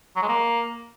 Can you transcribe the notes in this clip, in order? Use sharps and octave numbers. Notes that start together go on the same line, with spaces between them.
F#3
G#3
A#3